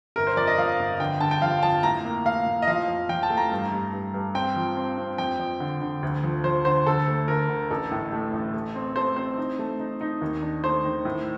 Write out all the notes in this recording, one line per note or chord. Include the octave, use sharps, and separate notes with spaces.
G1 A#4
C5
F2 D5
D#5
F2 F5
G1
D3 G5
D3 A5
G5
F3 F5
F2 A5
A2 A#5
A#3
A2 F5
A2
D#5
F3 F5
F2
F3 G5
A5
A3
A#5
G2
G2
G2
G2
C4 G5
F3
C4
C4
F2 G5
F2
D3
D3
D2
F3
F3 C5
D3 C5
D2 A4
A3
D2 A#4
D3
A1 A4
A2
A3
A1
A3
C4
A3 C5
C4 C5
D#4
A3
D#4
D#4
D#2
D4
A3 C5
D#3
A2